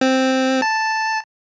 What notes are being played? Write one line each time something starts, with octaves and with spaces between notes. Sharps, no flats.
C4
A5